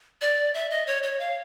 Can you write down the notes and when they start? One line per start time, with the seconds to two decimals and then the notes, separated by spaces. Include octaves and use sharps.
0.21 D5
0.54 E5
0.70 D#5
0.87 C#5
1.03 C#5
1.20 F5